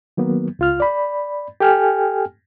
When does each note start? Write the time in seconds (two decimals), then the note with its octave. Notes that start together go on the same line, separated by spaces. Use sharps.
0.17 D#3 F#3 A#3 B3
0.59 C#2 F4 F6
0.80 D5 B5
1.60 G4 A4 G5 G#5 F6